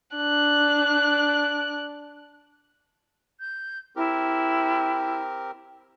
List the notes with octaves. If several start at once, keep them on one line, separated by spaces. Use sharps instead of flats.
D4 F#6
G6
C4 E4 G4 A#4